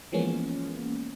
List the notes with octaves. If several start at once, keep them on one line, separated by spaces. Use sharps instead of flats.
E3 F3 G#3 A#3 B3 C#4